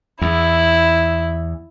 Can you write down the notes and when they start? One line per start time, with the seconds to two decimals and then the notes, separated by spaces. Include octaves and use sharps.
0.22 E2 E4